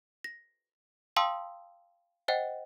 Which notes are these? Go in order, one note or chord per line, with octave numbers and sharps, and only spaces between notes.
A#6
F5 G5 A5 C6 D#6 E6
C5 D#5 F#5 G5